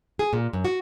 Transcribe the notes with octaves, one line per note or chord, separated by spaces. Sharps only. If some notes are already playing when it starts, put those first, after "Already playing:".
G#4
A#2
F#2
F#4